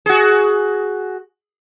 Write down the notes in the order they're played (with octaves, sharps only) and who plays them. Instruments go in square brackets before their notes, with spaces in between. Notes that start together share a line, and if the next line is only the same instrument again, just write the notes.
[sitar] F#4 G#4